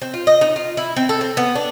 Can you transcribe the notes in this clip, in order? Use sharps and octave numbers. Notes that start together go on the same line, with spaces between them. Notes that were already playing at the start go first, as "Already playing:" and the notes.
C4
F4
D#5
D#4
F4
E4
C4
A4
C4
B3
D4